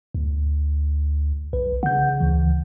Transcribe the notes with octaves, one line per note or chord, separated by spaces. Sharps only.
D2
B1 B4
C#3 F#5 G6
D2 E3